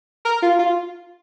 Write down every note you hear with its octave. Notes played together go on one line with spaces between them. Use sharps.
A#4
F4
F4